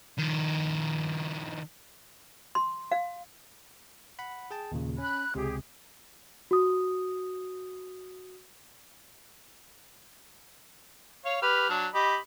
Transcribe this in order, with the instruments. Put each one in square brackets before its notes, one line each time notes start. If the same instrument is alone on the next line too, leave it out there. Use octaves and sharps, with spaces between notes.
[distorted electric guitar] D#3 F3
[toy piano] C6
F5
[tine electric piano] F#5 B5
G#4 G5 A5
D#2 A#2 C#3
[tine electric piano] C#4 [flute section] B5 F#6
[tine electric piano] C#2 C3 [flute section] G4 G#4
[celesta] F#4 D#6
[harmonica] C#5 F5
G4 B4 F6
F#3 D4
G4 D#5 B5